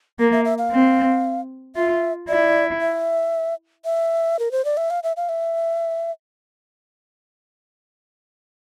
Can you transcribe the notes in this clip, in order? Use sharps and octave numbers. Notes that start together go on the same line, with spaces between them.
A#3 A#4
E5
E5
F5
C4
F4 E5
E4 D5
E5
E5
A#4
C5
D5
E5
F5
E5
F5
E5